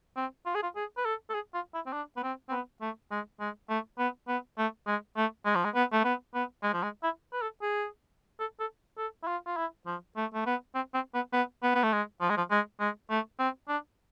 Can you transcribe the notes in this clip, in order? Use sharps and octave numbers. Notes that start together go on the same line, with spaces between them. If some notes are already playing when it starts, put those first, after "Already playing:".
C4
F4
G#4
F4
G#4
B4
A4
A4
G#4
F4
E4
C4
D4
B3
C4
C4
B3
A3
G#3
G#3
A3
B3
B3
A3
G#3
A3
G#3
F3
G#3
B3
A3
B3
B3
G#3
F3
G#3
E4
B4
A4
G#4
A4
A4
A4
E4
F4
F4
E4
F3
A3
A3
B3
C4
C4
B3
B3
B3
B3
A3
G#3
F3
G#3
F3
G#3
G#3
A3
C4
D4